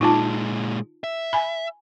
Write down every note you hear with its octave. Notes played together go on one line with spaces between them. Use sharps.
A#2 G#3 D#4 F4 A5
E5
G#5 B5